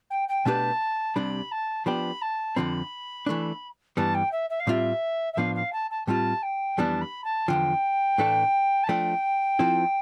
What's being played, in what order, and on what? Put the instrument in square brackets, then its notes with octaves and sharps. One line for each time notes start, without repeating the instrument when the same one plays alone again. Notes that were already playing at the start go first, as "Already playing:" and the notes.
[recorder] G5
G5
[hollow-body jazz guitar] B2 A3 D4 G4 B4 [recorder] A5
[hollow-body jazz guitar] C2 C3 G3 D4 [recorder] B5
[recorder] A5
[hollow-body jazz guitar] F3 B3 D4 G4 [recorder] B5
[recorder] A5
[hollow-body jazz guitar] F2 D3 F3 C4 [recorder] B5
[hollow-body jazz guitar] E3 A3 D4
[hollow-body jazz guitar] G2 E3 G3 B3 [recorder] A5
[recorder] G5
E5
E5
F5
[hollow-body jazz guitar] A2 G3 C4 F4 [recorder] E5
[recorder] E5
[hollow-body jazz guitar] A2 F3 B3 D4 [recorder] F5
[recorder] F5
A5
A5
[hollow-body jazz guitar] A2 G3 C4 F4 [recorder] A5
[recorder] G5
[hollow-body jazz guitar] F2 E3 G3 B3 D4 [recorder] A5
[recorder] B5
A5
[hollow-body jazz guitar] E2 D3 F3 [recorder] G5
[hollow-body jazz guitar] A2 E3 A3 D4 A4
[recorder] A5
[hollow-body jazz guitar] F3 A3 D4 A4 [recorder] G5
[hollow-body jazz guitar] F3 C4 E4 A4